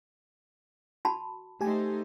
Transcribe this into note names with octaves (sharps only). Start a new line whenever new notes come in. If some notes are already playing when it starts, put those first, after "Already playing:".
F#4 A5 B5
A3 D#4 G4 C5 G#5